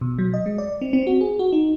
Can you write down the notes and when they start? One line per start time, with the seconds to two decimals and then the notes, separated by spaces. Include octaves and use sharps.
0.01 B2
0.18 F#3
0.34 D#5
0.46 G#3
0.58 D5
0.81 C4
0.93 C4
1.07 F#4
1.21 G#4
1.39 F#4
1.52 D#4